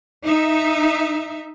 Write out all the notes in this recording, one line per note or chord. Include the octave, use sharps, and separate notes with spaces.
D#4 E5